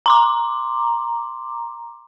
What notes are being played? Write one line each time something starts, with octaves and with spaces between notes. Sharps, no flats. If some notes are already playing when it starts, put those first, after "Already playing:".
A#5 C6 D6